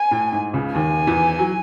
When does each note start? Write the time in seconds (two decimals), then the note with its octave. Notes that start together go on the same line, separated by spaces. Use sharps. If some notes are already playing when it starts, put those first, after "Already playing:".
Already playing: G#5
0.11 A2
0.32 G#2
0.53 C#2 C#3
0.75 D#2 D#3 G#5
1.07 E2 E3
1.39 F#3